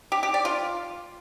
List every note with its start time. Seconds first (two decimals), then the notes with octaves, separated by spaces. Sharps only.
0.12 G4
0.23 G4
0.34 D5
0.45 F4